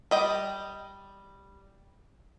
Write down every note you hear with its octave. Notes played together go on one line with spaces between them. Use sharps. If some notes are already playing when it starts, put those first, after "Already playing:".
G3 D#5 G5